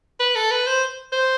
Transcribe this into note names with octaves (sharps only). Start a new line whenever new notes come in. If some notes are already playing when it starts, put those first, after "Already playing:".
B4
A4
B4
C5
C5